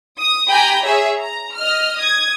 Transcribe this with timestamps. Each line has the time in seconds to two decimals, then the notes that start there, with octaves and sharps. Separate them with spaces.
0.17 D#6
0.50 G4 G5 G#5 A#5 B5 G6
0.84 G#4 C#5 E5
1.18 A#5
1.55 D#5 F6
1.97 D#6 G#6